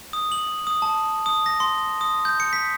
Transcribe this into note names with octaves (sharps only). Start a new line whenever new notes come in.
D#6
F#7
D#6
A5
D#6
A#6
C6
D#6
G6
C#7
B6